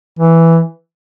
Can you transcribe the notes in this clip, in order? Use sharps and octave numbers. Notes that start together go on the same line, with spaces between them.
E3